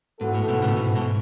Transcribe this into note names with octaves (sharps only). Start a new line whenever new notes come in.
G#2 E3 B3 F#4 A4
A2
G#2 B2
A2 C#3
G#2 B2
G#2 B2